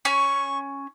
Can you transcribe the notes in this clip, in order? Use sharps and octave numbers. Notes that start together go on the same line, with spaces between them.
C#4 C#6